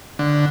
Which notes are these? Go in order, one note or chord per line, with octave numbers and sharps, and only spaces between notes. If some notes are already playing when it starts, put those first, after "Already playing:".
D3